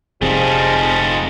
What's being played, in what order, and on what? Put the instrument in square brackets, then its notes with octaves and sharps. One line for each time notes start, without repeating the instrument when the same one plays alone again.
[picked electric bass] F1 F2 C3 [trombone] F3 [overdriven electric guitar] G3 D#4 [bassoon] G#4